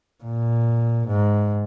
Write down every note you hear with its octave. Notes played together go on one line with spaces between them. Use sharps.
A#2
G#2